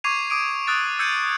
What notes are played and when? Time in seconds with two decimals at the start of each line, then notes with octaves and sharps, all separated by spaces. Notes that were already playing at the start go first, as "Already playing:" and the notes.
0.04 C#6 D6 G#6 C7 D#7 F7
0.30 D6 D#6 D7 D#7
0.67 D#6 E6 F#6 A6 D7
0.99 E6 G6 G#6 C#7 D#7